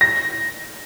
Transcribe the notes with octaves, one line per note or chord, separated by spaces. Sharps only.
A#6